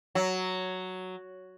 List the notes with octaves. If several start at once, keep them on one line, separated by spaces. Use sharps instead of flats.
F#3